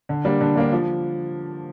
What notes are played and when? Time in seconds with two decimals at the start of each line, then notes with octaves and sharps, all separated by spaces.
0.09 D3
0.25 G3 A#3 D4
0.41 D3
0.56 G3 A#3 D4
0.72 F3